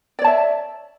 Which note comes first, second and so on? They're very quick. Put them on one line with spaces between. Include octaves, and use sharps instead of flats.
D5 C#5 A5 E5